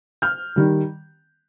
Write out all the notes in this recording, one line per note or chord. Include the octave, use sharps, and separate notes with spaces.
F6 G6
D#3 G3